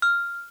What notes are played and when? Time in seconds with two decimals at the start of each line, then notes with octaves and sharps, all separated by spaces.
0.02 F6